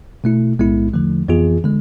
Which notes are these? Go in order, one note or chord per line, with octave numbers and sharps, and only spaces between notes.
B2 A3 E4
B1 A2 G#3 B3 E4
E2 D3 F3 A3
F2 E3 B3 F4 G#4
D3 G#3